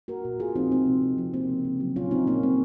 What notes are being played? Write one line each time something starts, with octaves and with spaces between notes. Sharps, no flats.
A#3 F#4 A#4
A#2
A#2 F4 G#4
F3 C4 D#4
G#3 C4
C3
C3
F3
A#3 C4
C#3
C#3
F#3
A#2 C#4 F4
G#3 C4 D#4
A#2 A#3 C#4
G#3 C4